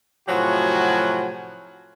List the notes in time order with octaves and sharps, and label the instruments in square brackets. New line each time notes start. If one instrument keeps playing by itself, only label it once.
[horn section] A2 C3 F3 F#3 F#4 G#5